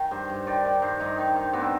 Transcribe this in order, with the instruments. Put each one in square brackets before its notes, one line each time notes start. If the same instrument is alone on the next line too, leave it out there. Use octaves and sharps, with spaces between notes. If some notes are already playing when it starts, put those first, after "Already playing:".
Already playing: [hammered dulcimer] D#3
G2 C5
G2
D#3 D5
D#3
G2 C5
G2 D#4
D#3
D#3
G2 B3
C4